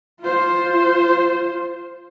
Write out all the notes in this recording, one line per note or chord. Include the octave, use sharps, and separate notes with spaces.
F4 C5